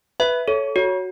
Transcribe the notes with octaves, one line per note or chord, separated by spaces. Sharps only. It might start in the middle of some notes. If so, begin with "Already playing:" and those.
B4 E5
A4 C#5
F#4 C#5